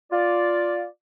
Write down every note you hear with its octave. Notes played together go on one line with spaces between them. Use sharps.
F4 D5